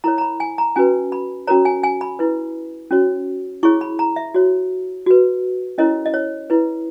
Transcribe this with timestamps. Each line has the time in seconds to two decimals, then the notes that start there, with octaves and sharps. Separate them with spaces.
0.04 E4 A#4 C#5 A#5
0.18 A#5
0.21 B5
0.40 G#5
0.58 A#5
0.76 C#4 F#4 B4 G#5
1.12 B5
1.47 C#4 F#4 A#4 C#5 A#5
1.65 G#5
1.83 G#5
2.01 B5
2.19 E4 B4
2.91 C#4 F#4 C#5
3.63 E4 G#4 C#5 C#6
3.81 B5
3.99 A#5
4.16 E5
4.34 F#4 C#5
5.06 F#4 B4
5.78 C#4 E4 A#4 C#5 D#5
6.06 D#5
6.14 C#5
6.50 E4 B4